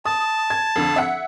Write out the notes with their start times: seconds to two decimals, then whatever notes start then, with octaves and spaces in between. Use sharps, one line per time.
0.05 A5 D#6
0.50 G#6
0.76 F2 D3
0.96 E5 F#5